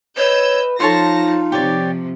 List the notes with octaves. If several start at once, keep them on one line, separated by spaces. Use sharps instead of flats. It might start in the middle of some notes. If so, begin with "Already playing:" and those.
B4 C#5 D#5 E6 G6
F3 D#4 F4 A4 C#5 A5 C6 A#6
C3 F3 G4 C#5 D5